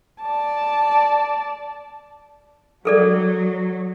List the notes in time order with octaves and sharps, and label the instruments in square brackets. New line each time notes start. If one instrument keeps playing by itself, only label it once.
[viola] D5 A5
[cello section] F#3 [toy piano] G#4 A4 D5